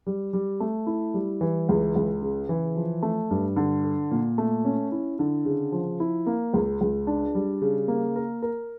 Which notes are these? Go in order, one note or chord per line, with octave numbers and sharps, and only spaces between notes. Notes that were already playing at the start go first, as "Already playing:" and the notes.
G3
G3
A3
E4
G3
E3
C#2
C#2
C#3
E3
F3
A3
G2
D3
A4
A#2
A3
C#4
E4
D3
C#3
F3
E4
A#3
C#2
C#2
D4
G3
C#3
A#3
A#4
A#4